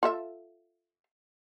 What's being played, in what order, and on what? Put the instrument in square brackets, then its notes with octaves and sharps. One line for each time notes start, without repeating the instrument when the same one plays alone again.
[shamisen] F4 A4 E5